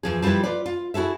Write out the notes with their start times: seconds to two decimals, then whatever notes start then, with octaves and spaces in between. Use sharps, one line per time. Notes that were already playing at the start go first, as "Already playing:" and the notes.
0.03 E2 F3 G#4
0.22 F3 G3 E4 G4 B4
0.44 F4 B4 D5
0.66 F4
0.94 E4 F#4 G#4 A4 E5